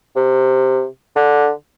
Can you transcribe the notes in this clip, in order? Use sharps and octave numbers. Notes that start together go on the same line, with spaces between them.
C3
D3